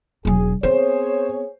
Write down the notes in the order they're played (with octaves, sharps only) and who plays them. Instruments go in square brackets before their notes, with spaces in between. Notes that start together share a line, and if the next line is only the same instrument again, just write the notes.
[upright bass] E1 F#3 [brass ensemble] G#4
[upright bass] B3 C4 [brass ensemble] G#4 C#5 [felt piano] C5